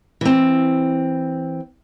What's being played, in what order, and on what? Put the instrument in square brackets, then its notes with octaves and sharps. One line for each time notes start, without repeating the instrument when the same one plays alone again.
[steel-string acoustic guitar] E3 C4